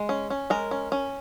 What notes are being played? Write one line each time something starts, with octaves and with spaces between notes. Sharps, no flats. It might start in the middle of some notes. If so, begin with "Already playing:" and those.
Already playing: G#3
C#4
C#4
G#3 A#4
C#4
C#4